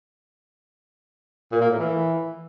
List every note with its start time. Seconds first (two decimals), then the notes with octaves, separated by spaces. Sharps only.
1.52 A#2
1.61 A#3
1.70 A2
1.79 E3